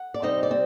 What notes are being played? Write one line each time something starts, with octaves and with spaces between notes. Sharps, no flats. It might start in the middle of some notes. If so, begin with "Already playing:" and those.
Already playing: F#5
D5
C3 G3 C4 D#4 D#5
D5
C4